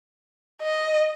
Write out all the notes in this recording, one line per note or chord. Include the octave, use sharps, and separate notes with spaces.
D#5